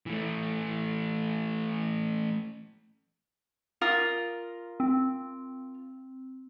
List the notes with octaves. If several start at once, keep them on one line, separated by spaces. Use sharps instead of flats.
E3 A3
F4 A#4 D#6
C4